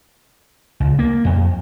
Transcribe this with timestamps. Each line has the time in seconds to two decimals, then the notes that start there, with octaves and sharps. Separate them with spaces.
0.80 C#2
0.99 A#3
1.25 F2